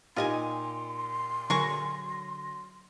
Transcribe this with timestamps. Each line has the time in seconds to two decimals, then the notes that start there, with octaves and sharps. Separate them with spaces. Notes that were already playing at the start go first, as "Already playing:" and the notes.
0.16 A#2 D#4 F4 G4 D#5 G#5 C6
1.50 D3 F#3 G#4 A#4 C#6 A#6